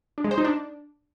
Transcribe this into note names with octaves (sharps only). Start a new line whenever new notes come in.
D4
G#3
C5
D#4
D4